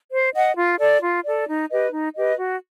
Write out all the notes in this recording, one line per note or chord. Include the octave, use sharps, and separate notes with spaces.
C5
D#5 F#5
F4
A4 D5
F4
A4 D5
D#4
G4 B4 D#5
D#4
G4 B4 D#5
F#4